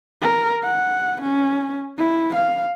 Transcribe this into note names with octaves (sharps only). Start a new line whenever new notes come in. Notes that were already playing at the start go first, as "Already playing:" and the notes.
A#4
F#5
C#4
E4
F5